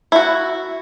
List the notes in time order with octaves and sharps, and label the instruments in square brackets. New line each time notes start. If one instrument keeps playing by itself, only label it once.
[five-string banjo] E4 F#4